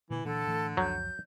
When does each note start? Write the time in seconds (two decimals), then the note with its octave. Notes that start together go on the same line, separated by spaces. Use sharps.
0.11 A#2 D3 E3
0.25 A#2 D3 E3 A4
0.47 A2 E3 A3
0.77 C#2 F#2 F3 F#3 G6